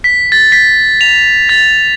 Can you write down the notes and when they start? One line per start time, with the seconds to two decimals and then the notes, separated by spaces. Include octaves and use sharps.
0.04 B6
0.32 A6
0.52 B6
1.01 F7
1.49 A6